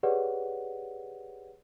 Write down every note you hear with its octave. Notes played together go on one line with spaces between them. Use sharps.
G4 G#4 B4 C#5 D5 F#5